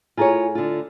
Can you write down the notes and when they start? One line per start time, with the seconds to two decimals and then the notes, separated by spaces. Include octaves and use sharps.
0.17 A2 F4 G#4 C#5 G#5 A#5
0.55 D3 F4